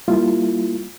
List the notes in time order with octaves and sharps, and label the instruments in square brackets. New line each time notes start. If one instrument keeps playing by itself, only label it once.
[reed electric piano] G3 A#3 E4 F4